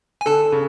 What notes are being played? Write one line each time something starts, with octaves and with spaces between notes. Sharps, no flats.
G#5
D3 A4 A5
C#3